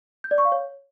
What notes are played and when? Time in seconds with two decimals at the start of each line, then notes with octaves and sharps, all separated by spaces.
0.24 G6
0.31 D5
0.38 C#6
0.45 F5
0.52 C#5